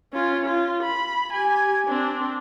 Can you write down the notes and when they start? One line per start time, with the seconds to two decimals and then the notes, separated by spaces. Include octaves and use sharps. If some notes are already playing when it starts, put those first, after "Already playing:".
0.13 C#4 F4
0.46 F4
0.83 B5
1.33 G4 G#5
1.87 C4 D4